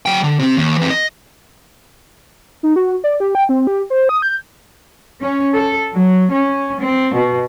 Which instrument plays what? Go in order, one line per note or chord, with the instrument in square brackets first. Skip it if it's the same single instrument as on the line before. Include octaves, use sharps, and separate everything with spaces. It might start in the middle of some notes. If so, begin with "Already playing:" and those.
[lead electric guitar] F#3 G5
D3
C3 C4
D#2
E3 C4
D#5
[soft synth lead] D#4
F#4
D5
G4
G5
C4
G4
C5
D#6
G6
[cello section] C#4
A4
F#3
C#4
C4
B2